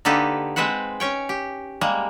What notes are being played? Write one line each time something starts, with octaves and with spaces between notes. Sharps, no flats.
D3 A#3 D#4 G4 A4 B4
G#3 C4 B4 C5 F#5
C#4 C#5 G5
G4
G3 G#3 A#3